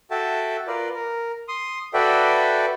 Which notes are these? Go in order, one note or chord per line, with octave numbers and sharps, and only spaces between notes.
F#4 A4 E5 G5 A5
F4 A#4 B4 D5
A#4
C6 D#6
F#4 A4 B4 D5 E5 G5